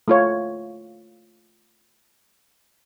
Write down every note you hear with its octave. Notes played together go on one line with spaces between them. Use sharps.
A3 F4 C#5